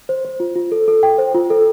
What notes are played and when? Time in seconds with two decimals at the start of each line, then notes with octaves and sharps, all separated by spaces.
0.09 C5
0.25 C5
0.40 F4
0.56 F4
0.72 A4
0.88 A4
1.03 G5
1.18 C5
1.35 F4
1.50 A4